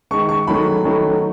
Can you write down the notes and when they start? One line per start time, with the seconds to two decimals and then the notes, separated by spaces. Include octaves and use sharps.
0.11 D#3 G#3 C#6
0.29 C#6
0.47 D#3 F#3 A3 B5
0.84 D#3 F#3 A3